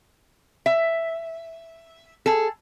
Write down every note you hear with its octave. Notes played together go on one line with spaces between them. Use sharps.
E5
G#4 A4